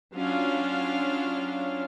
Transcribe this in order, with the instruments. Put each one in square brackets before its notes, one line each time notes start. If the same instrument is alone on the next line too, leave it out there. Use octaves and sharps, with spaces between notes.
[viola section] F#3 C#4 D4 F4 F5